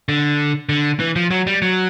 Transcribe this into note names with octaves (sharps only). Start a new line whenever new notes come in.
D3
D3
E3
F3
F#3
G3
F#3